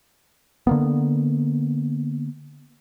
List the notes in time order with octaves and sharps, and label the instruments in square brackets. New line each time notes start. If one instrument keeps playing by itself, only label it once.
[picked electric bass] D3 A#3 B3